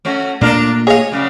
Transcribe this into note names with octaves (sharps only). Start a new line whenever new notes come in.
A3 C#4 F#4
A#2 A3 D4 F4 A#4
G#4 C#5 D#5 F5
F#2 C#3 G3